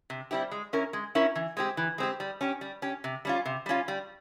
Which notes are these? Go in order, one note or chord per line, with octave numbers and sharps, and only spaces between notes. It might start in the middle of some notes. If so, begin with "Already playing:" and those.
C3
G3 C4 E4 G4
G#3
C#4 E4 A#4
G#3
C#4 E4 A#4
E3
G#3 C4 G4
E3
G#3 C4 G4
G3
C#4 G4
G3
C#4 G4
C3
G3 C#4 F4
C3
G3 C#4 F4
G3